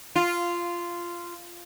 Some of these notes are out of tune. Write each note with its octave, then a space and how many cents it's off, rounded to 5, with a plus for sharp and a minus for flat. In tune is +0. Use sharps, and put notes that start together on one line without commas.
F4 -10